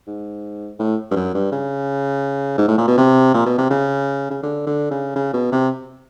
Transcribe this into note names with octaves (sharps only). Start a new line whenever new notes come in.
G#2
A2
G2
F#2
G2
C#3
G#2
A2
A#2
B2
C3
A#2
B2
C3
C#3
C#3
D3
D3
C#3
C#3
B2
C3